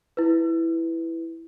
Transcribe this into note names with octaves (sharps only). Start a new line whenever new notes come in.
E4 B4